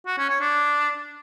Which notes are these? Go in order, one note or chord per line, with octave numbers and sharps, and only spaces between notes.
F#4
C#4
C#5
D4